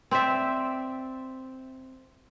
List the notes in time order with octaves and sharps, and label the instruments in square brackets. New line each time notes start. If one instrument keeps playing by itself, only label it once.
[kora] C4 C5 D5 E5